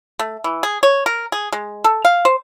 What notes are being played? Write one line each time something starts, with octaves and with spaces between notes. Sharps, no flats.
A3
E3
G#4
C#5
A#4
G#4
G#3
A4
F5
C5